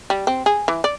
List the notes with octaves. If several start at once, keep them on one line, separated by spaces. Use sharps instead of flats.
G3
C4
G#4
E3
D5